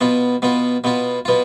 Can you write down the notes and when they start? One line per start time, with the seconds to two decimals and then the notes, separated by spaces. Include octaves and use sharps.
0.01 B2 B3 F4
0.42 B2 B3 F4
0.84 B2 B3 F4
1.25 B2 B3 F4